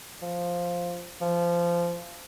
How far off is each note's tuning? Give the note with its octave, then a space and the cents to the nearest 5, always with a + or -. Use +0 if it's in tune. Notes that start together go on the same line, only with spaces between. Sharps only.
F3 +0
F3 -20